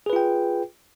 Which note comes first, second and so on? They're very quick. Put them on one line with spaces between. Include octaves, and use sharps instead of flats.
G#4 B4 F4 G5